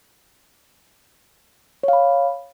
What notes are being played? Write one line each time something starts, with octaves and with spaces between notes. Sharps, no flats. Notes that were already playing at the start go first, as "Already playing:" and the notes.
C#5 F5 B5